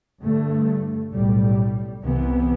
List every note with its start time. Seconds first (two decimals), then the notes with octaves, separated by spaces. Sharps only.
0.23 G2 D3 A3
1.13 B1 A2 G3
2.02 C2 C3 E3 B3